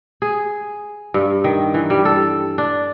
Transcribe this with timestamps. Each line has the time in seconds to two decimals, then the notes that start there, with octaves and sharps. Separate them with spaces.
0.22 G#4
1.14 G2
1.44 D#3
1.74 E3
1.90 G3
2.05 A4
2.58 D4